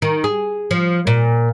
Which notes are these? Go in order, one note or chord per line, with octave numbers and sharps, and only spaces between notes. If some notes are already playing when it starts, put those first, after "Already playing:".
D#3
G#4
F3
A#2